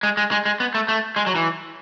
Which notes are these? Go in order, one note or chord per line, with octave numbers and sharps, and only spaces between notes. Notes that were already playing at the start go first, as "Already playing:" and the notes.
G#3
G#3
G#3
G#3
B3
A3
A3
G#3
F#3
E3